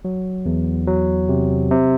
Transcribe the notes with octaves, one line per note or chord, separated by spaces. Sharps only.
F#3
E2
F#3
C3
C3